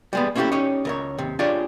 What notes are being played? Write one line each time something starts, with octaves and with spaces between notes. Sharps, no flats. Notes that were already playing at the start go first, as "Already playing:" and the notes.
G3 G#3 B3
A#3 C#4 E4 F#4 G4 A4
C#4 D#4 G4 C#5
C#2 A#4 C#5
D#2 C3
D4 F4 G4 G#4 C#5 D5